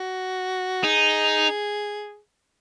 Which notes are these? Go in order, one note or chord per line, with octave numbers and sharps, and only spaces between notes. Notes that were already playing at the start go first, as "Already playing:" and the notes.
Already playing: F#4
D#4 G#4